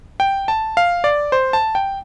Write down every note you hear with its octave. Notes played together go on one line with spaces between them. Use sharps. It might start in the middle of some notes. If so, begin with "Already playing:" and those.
G5
A5
F5
D5
C5
A5
G5